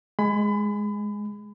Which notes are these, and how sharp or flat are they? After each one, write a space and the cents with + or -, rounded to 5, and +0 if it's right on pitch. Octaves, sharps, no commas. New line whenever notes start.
G#3 +0 G#5 +0 B5 +30